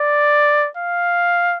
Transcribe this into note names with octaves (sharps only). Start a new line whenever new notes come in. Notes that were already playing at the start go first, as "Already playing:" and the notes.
Already playing: D5
F5